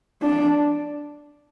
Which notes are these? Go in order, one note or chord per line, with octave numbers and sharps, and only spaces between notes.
D4